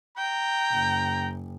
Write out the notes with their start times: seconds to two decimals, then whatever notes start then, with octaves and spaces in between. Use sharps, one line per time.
0.18 G5 A#5
0.72 F#1